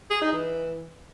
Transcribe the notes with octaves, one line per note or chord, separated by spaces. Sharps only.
G#4
D#4
E3